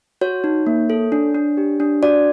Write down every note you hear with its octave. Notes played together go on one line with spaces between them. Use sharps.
F#4 C#5
D#4
A#3
A4
D4
D4
G4
D4
F#4 D5